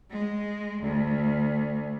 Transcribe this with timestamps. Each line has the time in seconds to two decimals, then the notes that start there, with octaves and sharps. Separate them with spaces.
0.10 G#3
0.82 D2